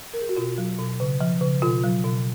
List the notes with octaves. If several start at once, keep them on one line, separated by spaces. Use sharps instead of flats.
A#4
G#4
F#4
B2 F4
F#3
B2
C#3
F3
C#3
B2 F4
F#3
B2